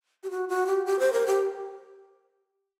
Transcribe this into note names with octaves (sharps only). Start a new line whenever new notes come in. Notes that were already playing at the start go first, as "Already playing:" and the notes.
G4
F#4
F#4
G4
G4
C5
A#4
G4